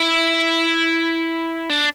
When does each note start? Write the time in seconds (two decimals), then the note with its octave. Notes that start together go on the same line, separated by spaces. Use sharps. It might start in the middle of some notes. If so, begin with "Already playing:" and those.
Already playing: E4
1.69 D4